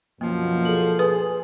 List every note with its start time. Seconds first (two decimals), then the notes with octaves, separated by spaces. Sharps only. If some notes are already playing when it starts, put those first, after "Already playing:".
0.21 F#2 B2 F3 A#3
0.65 G#4 A4 F#7
0.99 G#4 B4 D#6